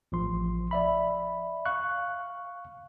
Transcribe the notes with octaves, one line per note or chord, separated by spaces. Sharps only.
A1 F3 C6
D5 E5 B5
F5 C#6 F#6